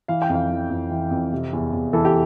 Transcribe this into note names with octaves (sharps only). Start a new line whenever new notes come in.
E3 F5
G5
F2 F5
E3
F2
E3
F2
C3
E2
E2
E3 A4
G4